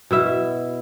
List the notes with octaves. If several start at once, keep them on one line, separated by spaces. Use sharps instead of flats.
B2 E4 E5